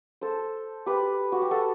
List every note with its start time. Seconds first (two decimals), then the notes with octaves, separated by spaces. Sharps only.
0.21 A4 C5
0.86 G4 B4
1.32 F#4
1.42 G4
1.51 F#4 A4